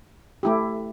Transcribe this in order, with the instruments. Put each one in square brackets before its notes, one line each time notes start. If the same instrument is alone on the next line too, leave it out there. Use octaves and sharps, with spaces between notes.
[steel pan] A3 E4 G4